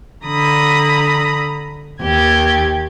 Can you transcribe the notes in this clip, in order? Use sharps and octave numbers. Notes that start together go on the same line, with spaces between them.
D3 A#5 B5 D#6
D#2 G4 G#6